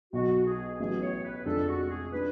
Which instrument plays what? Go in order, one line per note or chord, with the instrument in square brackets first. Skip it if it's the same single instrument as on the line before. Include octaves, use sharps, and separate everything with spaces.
[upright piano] B1 B2 F#3 [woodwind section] F#4
[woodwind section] G#4
[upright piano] A1 A2 F#3 B3 [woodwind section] G#4
[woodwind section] C#5
B4
[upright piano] F1 F2 F3 G#3 D4 [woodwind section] A4
[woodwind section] F#4
G#4
[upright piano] G#3 D4 [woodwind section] B4